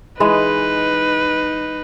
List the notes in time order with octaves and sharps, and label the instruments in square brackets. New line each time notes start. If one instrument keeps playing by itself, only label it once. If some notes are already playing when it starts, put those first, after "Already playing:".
[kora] E3 G#3 D#5 [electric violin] D#4 B4